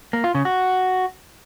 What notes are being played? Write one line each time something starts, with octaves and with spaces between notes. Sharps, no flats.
A#3
F4
C#3
F#4